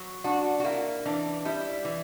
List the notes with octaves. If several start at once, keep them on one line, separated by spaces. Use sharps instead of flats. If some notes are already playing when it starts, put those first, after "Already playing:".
Already playing: F#3
D4 F#4
F#4
A#3 E4
E3 D4
G3 E4
E3